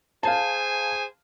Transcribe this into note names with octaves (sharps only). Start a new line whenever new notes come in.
G#4 C5 F5 G#5 A5